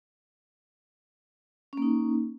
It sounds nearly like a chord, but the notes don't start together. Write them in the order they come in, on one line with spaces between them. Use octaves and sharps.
C#4 A#3 D#4